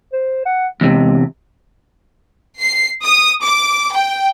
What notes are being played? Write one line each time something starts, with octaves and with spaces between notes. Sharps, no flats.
C5
F#5
E2 C3 G#3
C7
D#6
D6
G5